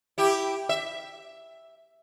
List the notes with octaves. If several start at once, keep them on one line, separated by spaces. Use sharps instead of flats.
E4 G4
E5